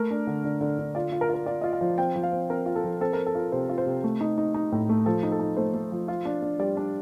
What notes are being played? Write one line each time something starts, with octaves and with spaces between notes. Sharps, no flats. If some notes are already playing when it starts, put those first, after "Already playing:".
Already playing: A3 A#4
D4
D3
D3
D3
D3
F4 D5
F4
A#4
F4
A#4
F4 D5
F4 D#5
F5
F3
C4 G5
F3
F5
C4
C4 A#4
F4
A4
F3
C4 A4
A#4
C4
A4
F4 A#4
C3 C5
F4
C5
C3
A3
D#4
D#4
D#4
A2
A3
F3 A4
D#4
A4
D#4
A3 C5
A3
F3
F4
D4
D4
G3 D5
D4